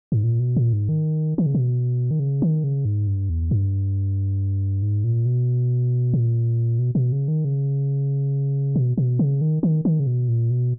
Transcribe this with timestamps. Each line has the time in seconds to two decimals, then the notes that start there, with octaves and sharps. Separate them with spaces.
0.12 G#2
0.24 A#2
0.40 B2
0.56 A#2
0.73 G#2
0.89 D#3
1.38 D#3
1.46 C#3
1.55 B2
2.11 D#3
2.20 C#3
2.42 D#3
2.64 C#3
2.85 G#2
3.07 G2
3.29 E2
3.51 G2
4.82 G#2
5.04 A#2
5.26 B2
6.13 A#2
6.79 B2
6.95 B2
7.12 C#3
7.28 D#3
7.45 C#3
8.76 B2
8.98 B2
9.19 C#3
9.41 D#3
9.63 D#3
9.85 D#3
10.00 C#3
10.07 B2
10.28 A#2
10.51 B2